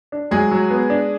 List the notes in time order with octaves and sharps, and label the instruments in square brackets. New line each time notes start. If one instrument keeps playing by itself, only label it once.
[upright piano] D4
[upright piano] F#3 [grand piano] G#3 G#4
[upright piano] F#3
B3
D4